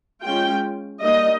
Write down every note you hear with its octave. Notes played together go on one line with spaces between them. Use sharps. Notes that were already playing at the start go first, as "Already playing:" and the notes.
G#3 C#4 F4 G5
G3 A#3 D#4 D#5